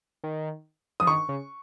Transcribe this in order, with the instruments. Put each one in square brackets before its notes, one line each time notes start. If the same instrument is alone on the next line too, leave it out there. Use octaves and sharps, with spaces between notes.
[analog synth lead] D#3
[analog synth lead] F3 [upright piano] D#6
[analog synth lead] D#3 [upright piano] C#6
[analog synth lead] C#3